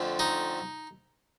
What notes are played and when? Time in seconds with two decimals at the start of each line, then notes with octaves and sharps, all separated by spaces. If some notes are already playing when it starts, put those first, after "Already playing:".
Already playing: F2 D3 A3 C4
0.19 D#4